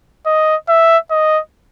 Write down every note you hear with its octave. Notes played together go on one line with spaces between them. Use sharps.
D#5
E5
D#5